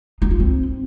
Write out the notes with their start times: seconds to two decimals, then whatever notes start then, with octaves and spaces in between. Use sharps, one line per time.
0.22 D#4
0.31 F4
0.40 C4